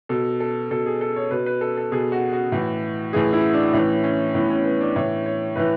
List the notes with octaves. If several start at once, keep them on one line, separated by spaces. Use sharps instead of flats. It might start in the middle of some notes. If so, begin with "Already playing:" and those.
B2 A4
A4
B2 A4
G#4
A4
C#5
B2 B4
B4
A4
A4
B2 G#4
F#4
F#4
A2 E3
A2 E3 G#4
E4
D4
A2 E3 C#4
C#4
A2 E3 B3
C#4
B3
D4
A2 E3 C#5
C#5
A2 E3 B4